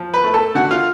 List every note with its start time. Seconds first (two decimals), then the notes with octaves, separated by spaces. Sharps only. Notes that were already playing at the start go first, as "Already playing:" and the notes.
Already playing: F3
0.14 B4 B5
0.24 A3
0.34 A4 A5
0.55 D3 F#4 F#5
0.71 F4 F5